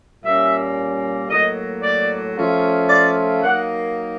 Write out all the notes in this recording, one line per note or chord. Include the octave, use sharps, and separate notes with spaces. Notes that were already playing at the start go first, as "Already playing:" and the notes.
A#2 G3 A#3 C#4 E5
A2 F#3 A#3 D#5
D5
F3 A3 C#4 F4
D5
F#3 A#3 D#4 F#5